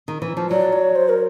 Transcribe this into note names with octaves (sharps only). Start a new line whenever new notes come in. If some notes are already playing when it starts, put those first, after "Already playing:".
D#3
E3
F3
F#3 D5
C#5
C5
A#4